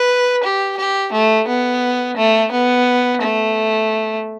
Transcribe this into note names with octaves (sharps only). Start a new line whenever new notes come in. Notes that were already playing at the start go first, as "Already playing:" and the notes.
Already playing: B4
G4
G4
A3
B3
A3
B3
A3